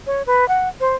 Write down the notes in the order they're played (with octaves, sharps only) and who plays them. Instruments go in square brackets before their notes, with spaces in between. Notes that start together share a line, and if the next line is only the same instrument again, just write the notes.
[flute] C#5
B4
F#5
C5